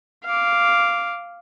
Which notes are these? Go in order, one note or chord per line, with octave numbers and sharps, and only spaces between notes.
F5 D6